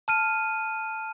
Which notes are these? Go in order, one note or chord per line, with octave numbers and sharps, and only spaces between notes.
A5 F6 D#7